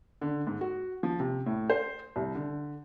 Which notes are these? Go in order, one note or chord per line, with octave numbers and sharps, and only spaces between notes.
D3
G#2
F#4
F3
C3
A2
C5
C2
D3